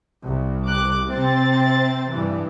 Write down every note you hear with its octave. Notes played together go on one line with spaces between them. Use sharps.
C2
D6 F#6
C3 C4 A6
G2 E3